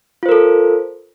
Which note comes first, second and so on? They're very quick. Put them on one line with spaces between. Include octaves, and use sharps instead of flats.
F4 C5 A#4 A4